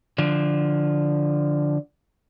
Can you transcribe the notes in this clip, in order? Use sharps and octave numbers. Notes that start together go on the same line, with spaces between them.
D3 F3